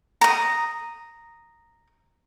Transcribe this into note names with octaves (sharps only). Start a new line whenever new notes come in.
A#5 D#6